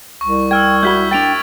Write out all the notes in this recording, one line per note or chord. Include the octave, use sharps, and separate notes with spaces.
C2 C#6
G5 E6 F6 G#6
E4 F#4 B5 G6 B6 G7
D4 G5 A6 D7 F7